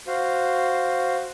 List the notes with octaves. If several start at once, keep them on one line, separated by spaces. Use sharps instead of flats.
F#4 C5 F5